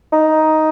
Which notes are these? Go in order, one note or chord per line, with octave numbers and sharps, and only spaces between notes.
D#4